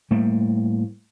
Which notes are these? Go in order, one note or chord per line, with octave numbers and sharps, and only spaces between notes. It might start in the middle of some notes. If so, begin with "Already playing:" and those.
A2 G3 A3 A#3